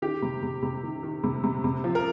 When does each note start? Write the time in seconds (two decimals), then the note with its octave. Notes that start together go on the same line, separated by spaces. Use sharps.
0.02 D#3 G4
0.22 C3
0.43 C3
0.63 C3
0.83 D#3
1.03 D#3
1.24 C3
1.44 C3
1.64 C3
1.84 F3
1.95 A#4